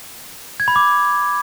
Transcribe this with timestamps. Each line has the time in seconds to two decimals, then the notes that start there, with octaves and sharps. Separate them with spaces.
0.60 G#6
0.68 B5
0.76 D6